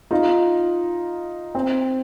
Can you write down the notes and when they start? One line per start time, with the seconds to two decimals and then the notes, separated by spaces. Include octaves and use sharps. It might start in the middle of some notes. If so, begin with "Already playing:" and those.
0.11 D#4 F4
1.55 C4